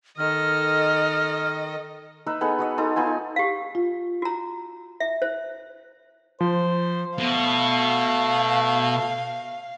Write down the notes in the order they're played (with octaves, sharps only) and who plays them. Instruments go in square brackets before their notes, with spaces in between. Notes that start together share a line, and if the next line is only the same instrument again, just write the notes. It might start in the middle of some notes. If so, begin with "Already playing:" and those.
[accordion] D#3 [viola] A4 D#5 [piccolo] F6
[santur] D#4 B4 E5 A#5
B3 D#4 G#4 A4
F#4 B4 D#5
D#4 A4 A#5 C6
B3 D#4 F4 G#5
[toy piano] G4 F5
[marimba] F4
[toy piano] F#4 A#5
E5
C5
[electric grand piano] F3 [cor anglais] C5
[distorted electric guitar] B2 [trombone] A3 [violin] F5